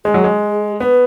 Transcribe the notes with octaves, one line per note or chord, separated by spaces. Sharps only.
G#3 G#4
F#3
G#3
B3 B4